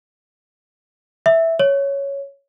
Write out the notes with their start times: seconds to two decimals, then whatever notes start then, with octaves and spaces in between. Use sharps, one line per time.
1.26 E5
1.59 C#5